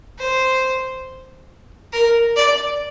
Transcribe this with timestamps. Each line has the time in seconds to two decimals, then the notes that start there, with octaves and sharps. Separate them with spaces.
0.19 C5
1.93 A#4
2.36 D5